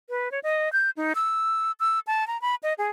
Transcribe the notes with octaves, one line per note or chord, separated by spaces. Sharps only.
B4
C#5
D#5
G6
D#4
E6
E6
A5
A#5
B5
D#5
G#4